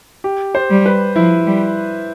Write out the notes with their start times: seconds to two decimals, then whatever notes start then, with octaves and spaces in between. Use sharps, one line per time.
0.24 G4
0.55 C5
0.70 G3
0.86 B4
1.16 F3 E4
1.47 G3